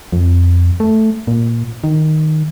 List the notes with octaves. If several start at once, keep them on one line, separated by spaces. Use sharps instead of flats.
F2
A3
A#2
D#3